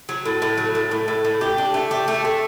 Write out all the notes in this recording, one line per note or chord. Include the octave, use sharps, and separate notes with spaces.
F#3
A2
A2
F#3
A2
A2
A2
A2
G4
D4
A3
G4
A3
A3